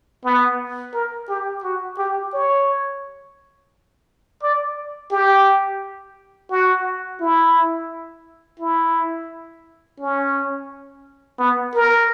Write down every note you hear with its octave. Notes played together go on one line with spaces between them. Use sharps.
B3
A#4
G4
F#4
G4
C#5
D5
G4
F#4
E4
E4
C#4
B3
A#4